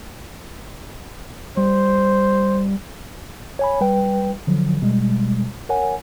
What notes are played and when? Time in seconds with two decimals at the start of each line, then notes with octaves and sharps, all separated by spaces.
1.57 G3 C5
3.59 C#5 G#5 B5
3.81 G3 B4 G5
4.47 D3 F3 F#3
4.82 B2 G3 G#3
5.69 A#4 C#5 F#5 G#5